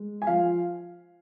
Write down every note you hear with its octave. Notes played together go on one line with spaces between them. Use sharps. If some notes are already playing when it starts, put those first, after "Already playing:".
Already playing: G#3
G#5
F3 F5